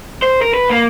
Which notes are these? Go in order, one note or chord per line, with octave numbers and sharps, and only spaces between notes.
C5
A#4
B4
A#3